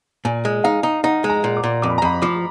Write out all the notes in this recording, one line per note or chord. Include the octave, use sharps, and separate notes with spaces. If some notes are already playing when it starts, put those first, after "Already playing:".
A#2 G#5
G#3
D#4 F5
D#4
D#4 F#5
G#3
A#5
A#2
D6
A#2
F2 D6
B5
A#5
F2 B5
F3 D6